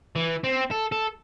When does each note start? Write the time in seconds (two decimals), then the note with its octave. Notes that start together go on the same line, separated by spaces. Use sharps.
0.16 E3
0.44 C4
0.71 A4
0.92 A4